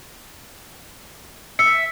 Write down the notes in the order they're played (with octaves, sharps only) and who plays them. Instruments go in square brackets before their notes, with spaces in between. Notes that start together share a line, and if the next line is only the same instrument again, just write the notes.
[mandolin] E5 [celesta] C#7